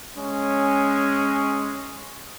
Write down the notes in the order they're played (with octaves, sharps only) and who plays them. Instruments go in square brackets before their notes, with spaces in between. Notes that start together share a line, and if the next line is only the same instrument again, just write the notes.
[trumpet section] G#3 C#4